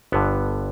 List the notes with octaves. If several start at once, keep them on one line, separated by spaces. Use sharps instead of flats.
G1 G2 D3 B3